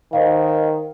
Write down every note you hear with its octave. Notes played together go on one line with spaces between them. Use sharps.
D#3 C5 D#5 F5